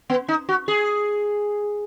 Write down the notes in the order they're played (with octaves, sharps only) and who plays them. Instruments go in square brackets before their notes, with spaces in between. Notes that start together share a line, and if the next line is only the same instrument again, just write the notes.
[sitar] B3
D#4
F#4
G#4